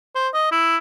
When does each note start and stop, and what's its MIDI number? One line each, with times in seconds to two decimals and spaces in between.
0.15 0.29 72
0.33 0.47 75
0.52 0.77 64